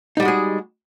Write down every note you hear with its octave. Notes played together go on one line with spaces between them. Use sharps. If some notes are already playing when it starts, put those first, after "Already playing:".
G3 G#3 D#4 F#4 G#4